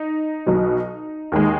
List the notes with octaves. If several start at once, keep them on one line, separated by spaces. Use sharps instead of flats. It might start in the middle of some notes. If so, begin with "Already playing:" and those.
Already playing: D#4
B1 B2 F#3
D#2 D#3 G#3